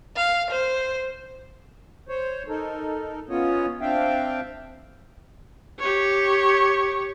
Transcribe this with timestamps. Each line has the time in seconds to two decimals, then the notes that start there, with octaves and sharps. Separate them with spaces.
0.16 F5
0.50 C5
2.09 C5 C#5
2.48 D#4 A4 A#4
3.29 B3 C#4 F4 C#5 D#5
3.81 C4 D4 E5 F5 G5
5.79 G4 C#5